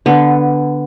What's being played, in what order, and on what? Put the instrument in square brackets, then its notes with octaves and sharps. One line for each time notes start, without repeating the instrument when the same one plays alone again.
[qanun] D3 B3